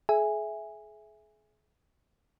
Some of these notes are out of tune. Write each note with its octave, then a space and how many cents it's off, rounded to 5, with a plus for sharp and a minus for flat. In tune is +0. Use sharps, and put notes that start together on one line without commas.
G#4 +35 E5 +0 G#5 -10